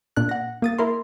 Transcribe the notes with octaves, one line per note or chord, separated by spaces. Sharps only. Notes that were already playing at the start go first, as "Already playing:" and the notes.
A#2 D4 F#6
F#5 A#6
A#3 D#6 A6
E4 A#4 C6